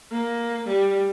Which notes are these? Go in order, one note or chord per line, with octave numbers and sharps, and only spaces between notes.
A#3
G3